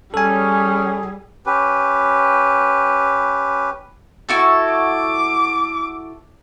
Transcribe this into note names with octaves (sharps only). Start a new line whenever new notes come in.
G3 C#4 G#4 A4 G#5
C#4 G4 B4
E4 F#4 A4
D6